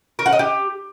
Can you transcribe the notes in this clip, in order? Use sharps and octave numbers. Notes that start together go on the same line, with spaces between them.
A#4
F#5
D#5
G4